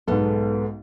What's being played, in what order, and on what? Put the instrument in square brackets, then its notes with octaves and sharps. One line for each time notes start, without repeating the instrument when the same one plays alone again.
[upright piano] B1 G#2 [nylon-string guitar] B3 A4